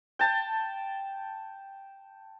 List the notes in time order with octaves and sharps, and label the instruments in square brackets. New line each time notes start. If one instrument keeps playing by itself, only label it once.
[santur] G5 A5